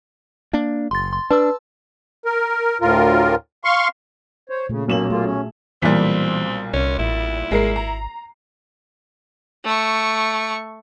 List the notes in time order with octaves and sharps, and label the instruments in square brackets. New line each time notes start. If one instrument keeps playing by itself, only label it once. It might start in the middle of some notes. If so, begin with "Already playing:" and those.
[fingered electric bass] A#3 D4
[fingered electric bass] F#1 [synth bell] C6 A6
[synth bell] C6
[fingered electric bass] D4 [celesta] B4 [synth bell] A5 E6
[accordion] A#4
D2 A2 F4 A#4
F5 C6 C#6
[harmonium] C5 C#5
[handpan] A#2 A3 [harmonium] C#3
[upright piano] B1 E7 F#7 [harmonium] A#3 C#4
[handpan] A3 G#4 [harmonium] A#3 F4
[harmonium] C#4
[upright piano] B1 A#2 G3 [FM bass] E3 [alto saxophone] C4 [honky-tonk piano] B6
[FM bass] C2 [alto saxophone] C#4
[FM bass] A1 [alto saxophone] E4
[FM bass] G#1 [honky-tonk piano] G#3 A#4 C7
[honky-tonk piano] A#5
[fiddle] A3 C#6